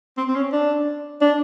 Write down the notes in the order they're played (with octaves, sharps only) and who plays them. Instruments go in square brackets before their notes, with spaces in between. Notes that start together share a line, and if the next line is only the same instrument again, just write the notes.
[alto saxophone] C4
C4
C#4
D4
D4